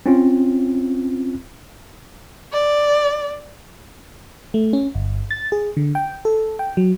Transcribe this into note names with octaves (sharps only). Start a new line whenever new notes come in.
C4 C#4 F4
D5
A3
C#4
G1
A6
G#4
D3
G5
A4
G5
F#3